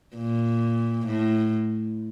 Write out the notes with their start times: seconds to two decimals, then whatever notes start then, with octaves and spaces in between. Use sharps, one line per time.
0.17 A#2
1.07 A2